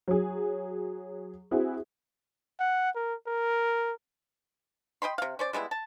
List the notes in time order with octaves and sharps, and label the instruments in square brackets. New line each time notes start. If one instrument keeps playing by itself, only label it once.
[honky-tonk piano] F#3 G#4
C4 E4 F#4 G#4
[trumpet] F#5
A#4
A#4
[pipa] D#5 G5 B5 C6
C3 F5
C#4 C5 D5
G3 G#3 B3 E4
A5